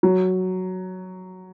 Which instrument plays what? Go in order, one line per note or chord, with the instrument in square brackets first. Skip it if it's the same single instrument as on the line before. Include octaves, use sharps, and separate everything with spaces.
[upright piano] F#3